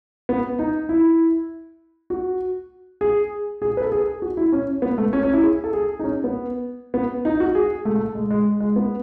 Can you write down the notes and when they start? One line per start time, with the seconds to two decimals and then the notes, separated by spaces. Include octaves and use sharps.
0.29 B3
0.59 D#4
0.89 E4
2.10 F#4
3.01 G#4
3.62 G#4
3.77 B4
3.82 A4
3.92 G#4
4.22 F#4
4.37 E4
4.52 C#4
4.82 B3
4.98 A3
5.13 C#4
5.23 C#4
5.33 E4
5.43 G#4
5.64 A4
5.73 G#4
5.99 D#4
6.04 C#4
6.24 B3
6.94 B3
7.25 D#4
7.40 F#4
7.55 G#4
7.85 A3
7.95 A3
8.15 G#3
8.31 G#3
8.60 G#3
8.76 B3